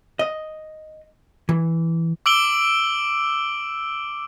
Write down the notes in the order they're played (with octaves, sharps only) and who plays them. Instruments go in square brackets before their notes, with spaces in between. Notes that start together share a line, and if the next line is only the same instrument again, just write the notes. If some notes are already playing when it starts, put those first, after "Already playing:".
[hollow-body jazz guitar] D#5
E3
[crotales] D6 E6 D7 F#7 G7